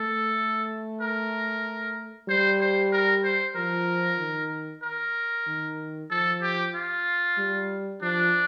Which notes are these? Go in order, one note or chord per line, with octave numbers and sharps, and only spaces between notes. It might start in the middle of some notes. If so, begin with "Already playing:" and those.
Already playing: A3 A4
A#4
G3 C5
C5
A#4
C5
F3 A#4
D#3
A#4
D#3
F3 A4
G4
F4
G3
F3 D4